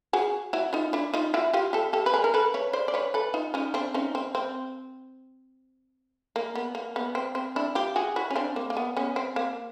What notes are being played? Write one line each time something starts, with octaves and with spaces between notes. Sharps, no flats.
F#4 G#4
E4 F#4
D#4 F4
D4 E4
D#4 F4
E4 F#4
F4 G4
G4 A4
G4 A4
B4
G#4 A#4
A#4
A4 B4
B4 C#5
C5 D5
D5
B4 C#5
A4 B4
D#4 F4
C#4 D#4
C4 D4
C#4 D#4
C4
C4
A#3
B3
A#3
B3
C4
C4
D4 E4
F4 G4
F#4 G#4
E4 F#4
C#4
C4 D4
A#3
A#3
B3
B3 C#4
C4
A#3